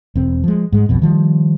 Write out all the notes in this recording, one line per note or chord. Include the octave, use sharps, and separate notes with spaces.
E1 C4
F3 G#3
G#2 G#3
B1 F2 B2
D#3 F3 G3